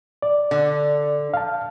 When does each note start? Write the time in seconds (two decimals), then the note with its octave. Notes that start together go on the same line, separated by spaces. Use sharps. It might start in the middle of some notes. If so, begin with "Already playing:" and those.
0.22 D5
0.51 D3
1.34 F5 A5